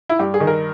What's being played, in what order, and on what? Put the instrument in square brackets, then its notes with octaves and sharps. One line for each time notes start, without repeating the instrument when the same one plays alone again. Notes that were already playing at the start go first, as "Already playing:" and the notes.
[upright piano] E4
G2 G4
G#4
D#3
A#4